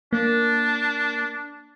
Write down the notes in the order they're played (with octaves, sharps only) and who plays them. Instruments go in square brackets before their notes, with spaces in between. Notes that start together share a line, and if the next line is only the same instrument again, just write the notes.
[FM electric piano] A#3 [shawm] D4